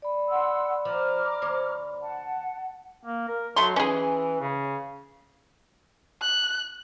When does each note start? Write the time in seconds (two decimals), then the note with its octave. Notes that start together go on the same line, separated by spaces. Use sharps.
0.02 D5 B5
0.29 F#5 C6 E6
0.85 F3 A#5 D6 F6
1.42 D2 C5 C#5
2.01 F#5 A5
3.04 A#3
3.28 A#4
3.56 F#3 A3 C6
3.76 E3 C#4 G#4
4.40 C#3
6.22 F#6